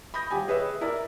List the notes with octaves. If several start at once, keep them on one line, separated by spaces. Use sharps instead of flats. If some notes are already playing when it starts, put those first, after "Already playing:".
B5 D#6 G6 A#6
D#1 G4 G#5
G#4 B4 C#5 E5
E4 A#4 D5